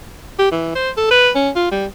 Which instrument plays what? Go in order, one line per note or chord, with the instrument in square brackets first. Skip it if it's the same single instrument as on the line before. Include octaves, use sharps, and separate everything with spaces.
[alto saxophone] G4
E3
C5
A4
B4
C#4
F4
G3